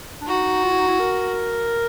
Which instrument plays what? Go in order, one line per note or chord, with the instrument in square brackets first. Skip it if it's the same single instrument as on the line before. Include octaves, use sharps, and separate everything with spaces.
[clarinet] D4
[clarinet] D#4 [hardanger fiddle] F#4
[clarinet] F4
E4
D#4
E4
A#4